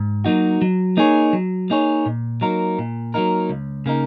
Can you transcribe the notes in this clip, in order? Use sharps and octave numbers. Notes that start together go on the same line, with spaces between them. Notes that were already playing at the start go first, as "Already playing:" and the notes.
Already playing: G#2
F#3 A#3 D#4 F#4
F#3
A#3 D#4 G#4 C#5
F#3
A#3 D#4 G#4 C#5
A#2
F#3 A#3 D#4 A#4
A#2
F#3 A#3 D#4 A#4
C#2
C#3 A#3 D#4